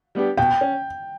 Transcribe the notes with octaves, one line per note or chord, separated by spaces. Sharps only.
G3 B3 D4 G4
B2 G5
C#4